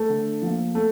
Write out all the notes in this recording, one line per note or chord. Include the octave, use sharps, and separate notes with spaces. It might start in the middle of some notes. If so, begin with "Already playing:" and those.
Already playing: A3 A4
D3
F3 A#3
A3 A4